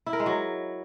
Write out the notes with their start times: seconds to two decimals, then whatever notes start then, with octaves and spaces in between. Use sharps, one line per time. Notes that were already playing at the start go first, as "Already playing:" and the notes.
0.06 E4
0.13 A#4
0.20 G#3
0.26 F#3